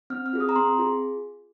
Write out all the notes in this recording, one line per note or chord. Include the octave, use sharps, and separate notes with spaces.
C4 F6
F6
F4 G#4
D#6
A#5
C4 C6
F4 G#4